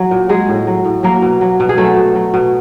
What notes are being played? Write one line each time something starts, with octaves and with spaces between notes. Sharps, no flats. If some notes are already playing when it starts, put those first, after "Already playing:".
Already playing: F#3
A#2
F#3 G#3 G#4
A2
F#3
A2
F#3 A#3 A#4
B2
F#3
B2
G#4
F#3 A3 A4
B2
F#3
B2